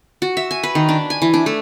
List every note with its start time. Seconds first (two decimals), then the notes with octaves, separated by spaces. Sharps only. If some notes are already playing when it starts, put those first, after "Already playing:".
0.22 F#4
0.37 E5
0.51 G#5
0.63 B4
0.75 D#3
0.89 D4
1.10 G#5
1.22 E3
1.34 D4
1.46 A3